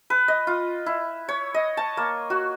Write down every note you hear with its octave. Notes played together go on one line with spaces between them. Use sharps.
B4
D#5
F4
E4
C#5
D#5
A5
A#3
F#4